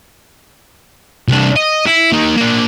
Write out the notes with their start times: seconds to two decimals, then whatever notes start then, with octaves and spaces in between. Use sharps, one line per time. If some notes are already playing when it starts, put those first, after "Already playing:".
1.28 C2 D4
1.56 D#5
1.87 E4
2.12 A#3 D#4
2.37 A#3 D4